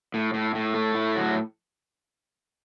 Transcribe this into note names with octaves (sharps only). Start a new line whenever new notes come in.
A2
A2
A2
A3
A2
F#3